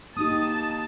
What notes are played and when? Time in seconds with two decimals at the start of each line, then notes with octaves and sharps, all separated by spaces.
0.17 A#3 D#4 G4 A5 D#6